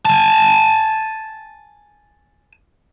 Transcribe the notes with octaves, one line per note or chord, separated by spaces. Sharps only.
G#5 A5